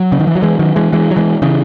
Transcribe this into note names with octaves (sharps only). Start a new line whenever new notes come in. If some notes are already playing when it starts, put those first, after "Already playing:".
Already playing: F#3
C#3
D#3
E3
F#3
E3 G#3
D#3 F#3
E3 G#3
E3 G#3
F#3
E3 G#3
C#3 E3